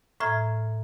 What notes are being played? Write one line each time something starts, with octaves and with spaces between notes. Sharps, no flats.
A2 E5 A#5 F6 G#6